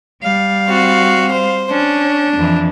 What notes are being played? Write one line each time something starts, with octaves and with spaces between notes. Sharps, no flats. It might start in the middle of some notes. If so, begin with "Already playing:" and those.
G3 F5
C4 F#4
C5
C#4 D4
F2 E3